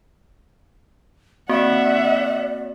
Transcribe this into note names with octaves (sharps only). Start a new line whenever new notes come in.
A#3 C4 F#4 D5 E5 F#5